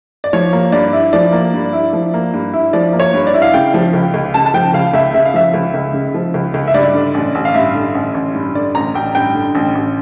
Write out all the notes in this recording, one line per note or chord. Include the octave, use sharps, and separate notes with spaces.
D5
F3 C#5
A#3
G2 D5
E4
F3 D5
A#3
G2
E4
F3
A#3
G2
E4
F3 D5
A#3
C#5
G2
D5
E4
F5
C#3 G5
F3
C#2
C#2
C#3 A5
A5
F3 G5
C#2 F5
C#2 E5
C#3 E5
F5
F3 E5
C#2
C#2
C#3
F3
C#2
C#2
E5
G2 D5
D3
A1
A1
F5
G2 E5
D3
A1
A1
G2
D3 D5
A1 A#5
A1 G5
G2 G5
D3
A1
A1